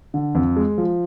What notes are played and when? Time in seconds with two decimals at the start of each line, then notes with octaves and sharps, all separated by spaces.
0.14 D3
0.35 F2
0.56 G#3
0.78 F3